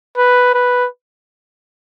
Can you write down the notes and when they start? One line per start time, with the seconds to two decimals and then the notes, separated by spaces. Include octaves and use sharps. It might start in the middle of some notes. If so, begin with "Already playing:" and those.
0.17 B4
0.54 B4